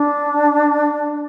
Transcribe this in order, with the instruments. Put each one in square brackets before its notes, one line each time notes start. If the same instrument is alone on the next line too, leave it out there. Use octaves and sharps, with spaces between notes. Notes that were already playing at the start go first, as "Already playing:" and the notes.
Already playing: [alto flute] D4